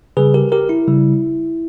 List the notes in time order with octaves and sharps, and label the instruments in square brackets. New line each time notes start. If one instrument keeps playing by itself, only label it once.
[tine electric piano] C#3 G3 G#4 B4
G4 A#4
G4 A#4
E4
C#3 G3